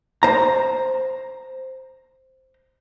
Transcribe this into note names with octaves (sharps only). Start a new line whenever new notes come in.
C5 A#5